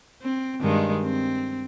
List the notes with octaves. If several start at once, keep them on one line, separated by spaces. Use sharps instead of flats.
C4
G2 D#3 G#3
C4